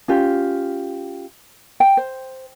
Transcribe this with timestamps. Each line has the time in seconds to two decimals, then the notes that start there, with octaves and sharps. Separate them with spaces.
0.08 C#4 F4 G4
1.80 G5
1.97 C5